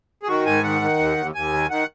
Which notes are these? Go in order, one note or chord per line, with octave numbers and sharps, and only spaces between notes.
G#4
D#3 F#4
G#2 G#5
D#3 F#5
D#3
D#2
D#2
D#2 G#5
D#3
D#3 F#5